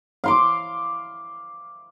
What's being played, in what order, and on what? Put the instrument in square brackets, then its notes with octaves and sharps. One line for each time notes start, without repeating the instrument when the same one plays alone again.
[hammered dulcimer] F5 C6 D6